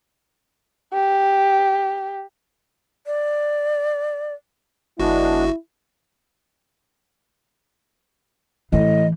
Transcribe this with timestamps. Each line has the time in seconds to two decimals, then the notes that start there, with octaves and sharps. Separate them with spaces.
0.94 G4
3.06 D5
5.00 G1 G#3 B3 D4 E4 F#4
8.72 A2 E3 D#5